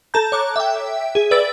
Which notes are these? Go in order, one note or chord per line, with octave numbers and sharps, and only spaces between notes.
A4 A5 A#5 G6
C#5 D6 F#6
E5 G5
G#4
B4 D5 E6 A6 D7